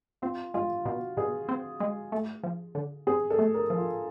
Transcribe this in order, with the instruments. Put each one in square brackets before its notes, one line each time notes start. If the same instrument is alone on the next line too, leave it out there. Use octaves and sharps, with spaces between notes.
[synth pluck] C4 [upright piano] F4
[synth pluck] G#3 [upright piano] F4
[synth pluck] B2 [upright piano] F#4
[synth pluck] B2 [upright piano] G#4
[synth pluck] C4
G#3
A3
F3
D3
[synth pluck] C4 [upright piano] G#4
[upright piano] A4
[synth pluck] A3
[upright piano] A#4
[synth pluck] F3
[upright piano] F4